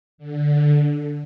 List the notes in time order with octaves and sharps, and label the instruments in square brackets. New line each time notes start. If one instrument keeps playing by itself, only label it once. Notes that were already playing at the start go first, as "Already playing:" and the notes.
[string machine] D3